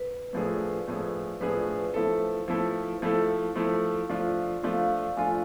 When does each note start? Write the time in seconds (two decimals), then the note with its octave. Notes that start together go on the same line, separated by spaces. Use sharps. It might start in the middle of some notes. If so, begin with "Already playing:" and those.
Already playing: B4
0.33 A2 F3 A3 D4 G#4
0.88 A2 F3 A3 D4 G#4
1.41 A2 F3 A3 D4 G#4 B4
1.94 F3 A3 E4 A4 C5
2.48 F3 A3 E4 A4
3.02 F3 A3 E4 A4
3.56 F3 A3 E4 A4
4.09 F3 A3 D4 F4 F5
4.62 F3 A3 D4 F4 F5
5.16 F3 A3 D4 F4 G#5